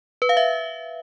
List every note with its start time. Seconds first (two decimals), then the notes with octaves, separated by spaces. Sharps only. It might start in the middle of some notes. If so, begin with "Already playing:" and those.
0.22 B4
0.29 F5
0.37 E5